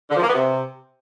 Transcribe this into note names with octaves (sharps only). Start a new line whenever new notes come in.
D3
F3
A#3
B3
C3